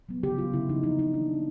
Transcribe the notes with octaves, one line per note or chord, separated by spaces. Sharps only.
F#3 B3
C#3 G4
F#3 B3 F4
C#3 E4
F3 A#3 D#4
C#3 D#4
F3 A#3 D#4
E3 D4
G#3 B3